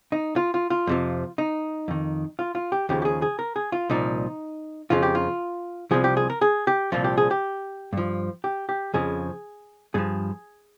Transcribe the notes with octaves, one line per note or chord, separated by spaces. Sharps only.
D#4
F4
F4
F4
F2 C3 F3
D#4
F2 D#3
F4
F4
G4
D#2 C#3 F3 G4
G4
G#4
G#4
A#4
G#4
F4
C2 A#2 F3 D#4
F2 C#3 F3 F4
G4
F4
C2 C3 F3 G#4
G4
G#4
A#4
G#4
G4
C2 A#2 F3 F4
G4
G#4
G4
G2 F3
G4
G4
F2 C#3 F3 G#4
G2 F3 G#4